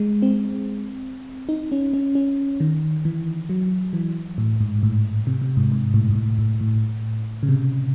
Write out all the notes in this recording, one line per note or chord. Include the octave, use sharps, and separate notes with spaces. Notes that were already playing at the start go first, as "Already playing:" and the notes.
Already playing: G#3
C4
D#4
C#4
C#4
C#4
D#3
E3
F#3
E3
A2
G#2
A2
C3
C3
G#2
G#2
A2
G#2
A2
A2
A2
C#3
C3